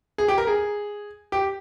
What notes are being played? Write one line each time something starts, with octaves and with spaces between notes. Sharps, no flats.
G#4
G4
A#4
G#4
G4